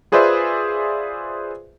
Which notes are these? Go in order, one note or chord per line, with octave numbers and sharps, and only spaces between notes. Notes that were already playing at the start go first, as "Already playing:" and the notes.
F4 G#4 B4 C5 D5 E5